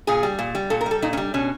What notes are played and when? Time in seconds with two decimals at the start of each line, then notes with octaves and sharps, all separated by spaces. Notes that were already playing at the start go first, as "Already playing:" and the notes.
0.07 A#2 G#4
0.23 G3
0.39 A#2
0.55 G3
0.70 A#2 A4
0.81 A#4
0.86 G3 A4
1.02 A#2 D#4
1.13 C#4
1.17 G3
1.34 B2 C#4